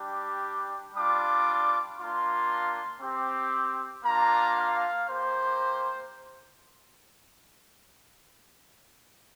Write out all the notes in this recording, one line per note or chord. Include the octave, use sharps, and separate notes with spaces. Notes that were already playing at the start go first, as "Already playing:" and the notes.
Already playing: G3 D4 G4
G3 D4 F4 D6
A#3 D4 F4 C6
C4 G4
A#3 D4 F4 A#5
F5
A#3 G4 C5